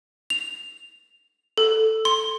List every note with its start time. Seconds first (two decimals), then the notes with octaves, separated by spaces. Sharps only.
0.30 F7
1.58 A4
2.05 C6